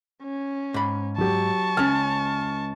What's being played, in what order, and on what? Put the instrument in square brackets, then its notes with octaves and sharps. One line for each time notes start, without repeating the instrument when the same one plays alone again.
[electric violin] C#4
[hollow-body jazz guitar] G#2 B5
[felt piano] F#3 G4 [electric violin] A5 C#6
[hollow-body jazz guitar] C#2 C#4 [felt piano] F6 A6